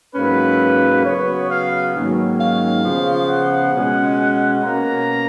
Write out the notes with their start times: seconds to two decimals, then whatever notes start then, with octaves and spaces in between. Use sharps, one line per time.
0.15 G#2 F#3 A#3 C#4 B4
1.05 C#3 F#3 B3 C#5
1.50 F5
1.94 G#2 D#3 F#3 A#3 C#4
2.39 F5
2.84 C#3 F3 B3
3.29 F#5
3.73 B2 G#3 C#4
4.63 B2 A#3 C#4 A#5